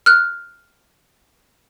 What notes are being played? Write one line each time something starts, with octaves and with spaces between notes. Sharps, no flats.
F6 F#6